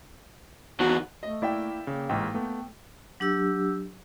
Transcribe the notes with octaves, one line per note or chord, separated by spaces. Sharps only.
E2 D#3 F#4
A3 D#5
A#3 E4 D5 E5 G5
C#3 A#3
A1 G#2 G5
A3 B3
F#3 D4 G4 E6